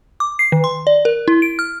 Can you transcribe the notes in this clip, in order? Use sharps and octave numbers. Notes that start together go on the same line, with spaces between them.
D6
C7
D#3
C6
D5
A#4
E4
D7
F6